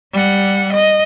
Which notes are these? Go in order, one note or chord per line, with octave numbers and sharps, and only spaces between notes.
G3 F#5
D#5